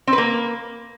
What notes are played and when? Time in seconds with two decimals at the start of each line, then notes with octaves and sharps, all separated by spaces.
0.07 C4
0.13 B4
0.18 A#3